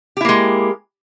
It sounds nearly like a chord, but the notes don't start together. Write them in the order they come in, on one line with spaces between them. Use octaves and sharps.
G4 E4 A#3 G#3